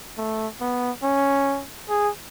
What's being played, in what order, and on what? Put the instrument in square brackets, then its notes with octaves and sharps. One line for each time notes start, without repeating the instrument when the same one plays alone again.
[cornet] A3
B3
C#4
G#4